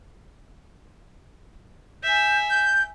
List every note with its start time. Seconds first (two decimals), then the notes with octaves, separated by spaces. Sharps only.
2.03 E5 G#5 G6
2.50 G6